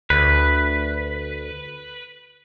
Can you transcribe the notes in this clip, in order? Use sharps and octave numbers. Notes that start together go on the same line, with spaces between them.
D2 B4